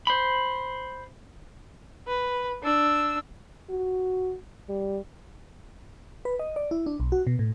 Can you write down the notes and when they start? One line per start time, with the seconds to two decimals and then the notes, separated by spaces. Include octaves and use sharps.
0.07 C5 B5
2.07 B4
2.63 D4 E6
3.70 F#4
4.69 G3
6.25 B4
6.39 D#5
6.56 D5
6.71 E4
6.86 D4
7.00 B1
7.12 F#4
7.27 B2
7.39 A2